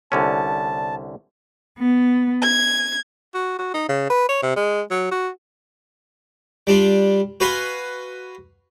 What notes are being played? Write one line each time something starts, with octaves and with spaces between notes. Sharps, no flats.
C2 D3 C#4 A5
B3
G#6
F#4
F#4
D#4
C#3
B4
C#5
C3
G#3
F#3
F#4
G3 D4 F4
F#4 B4 F5 G#5 C6